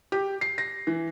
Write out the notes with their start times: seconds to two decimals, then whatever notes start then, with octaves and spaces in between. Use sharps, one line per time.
0.12 G4
0.41 C7
0.58 A#6
0.87 E3